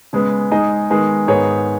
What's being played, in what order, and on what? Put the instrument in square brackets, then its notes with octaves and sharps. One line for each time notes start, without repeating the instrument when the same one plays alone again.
[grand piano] C#3 G#3 B3
G#3 D#4 G#4 D#5
D#3 G#3 B3
G#2 D#3 B3 G#4 C#5